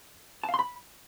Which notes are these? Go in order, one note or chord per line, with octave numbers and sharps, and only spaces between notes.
A5
F5
C6
B5